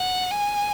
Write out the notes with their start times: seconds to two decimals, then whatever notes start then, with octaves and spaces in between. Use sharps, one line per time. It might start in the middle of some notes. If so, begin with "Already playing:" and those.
Already playing: F#5
0.30 G#5